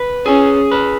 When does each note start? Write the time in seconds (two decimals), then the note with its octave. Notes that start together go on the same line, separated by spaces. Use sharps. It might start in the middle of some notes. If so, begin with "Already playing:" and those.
Already playing: B4
0.25 C#4 G#4
0.72 B4